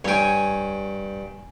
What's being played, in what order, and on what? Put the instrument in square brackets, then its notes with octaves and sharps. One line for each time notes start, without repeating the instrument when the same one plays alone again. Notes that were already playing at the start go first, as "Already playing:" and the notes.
[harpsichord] G2 G5 [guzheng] C#5 G#5